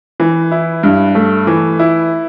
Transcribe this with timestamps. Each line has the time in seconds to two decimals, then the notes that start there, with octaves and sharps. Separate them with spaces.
0.20 E3
0.51 E4
0.83 G2
1.15 A3
1.47 E3
1.79 E4